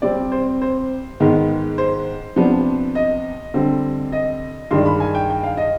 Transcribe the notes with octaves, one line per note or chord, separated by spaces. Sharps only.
C3 G3 C4 D5
C5
C5
G#2 D#3 G#3 B3
C5
C3 F3 B3 D4
D#5
D3 G3 C4
D#5
G2 D#3 G#3 D4 C6
B5
G#5
G5
G5
F5
D#5